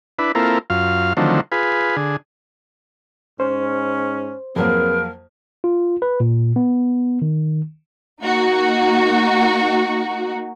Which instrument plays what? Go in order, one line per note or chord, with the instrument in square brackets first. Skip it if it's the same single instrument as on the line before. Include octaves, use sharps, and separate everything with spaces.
[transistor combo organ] D4 E4 B4
A#3 C4 E4 F4 A4 A#4
F#2 F4 F5
D3 D#3 F3 F#3 A3 C4
F4 G#4 B4
D3 G#4
[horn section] G#2 C#4 [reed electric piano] C5
[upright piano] F2 F#3 A#3 [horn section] C4 G#4 B4 [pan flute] A#4
[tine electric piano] F4
B4
A#2
B3
D#3
[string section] A#3 D#4 F#4